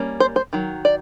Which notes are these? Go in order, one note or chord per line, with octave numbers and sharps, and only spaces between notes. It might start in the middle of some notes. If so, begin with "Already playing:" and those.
Already playing: G3 A#3 C#4
C5
C5
D#3 F#3
D5